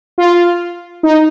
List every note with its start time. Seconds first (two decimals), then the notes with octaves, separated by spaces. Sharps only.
0.18 F4
1.03 D#4